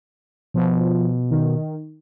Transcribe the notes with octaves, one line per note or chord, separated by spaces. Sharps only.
B2 F3
D#3